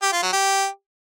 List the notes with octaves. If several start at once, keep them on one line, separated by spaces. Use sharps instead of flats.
G4
F4
F#3
G4